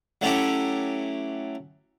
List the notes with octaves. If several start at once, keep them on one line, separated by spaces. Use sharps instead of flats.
F#3 A3 C#4 E4 G4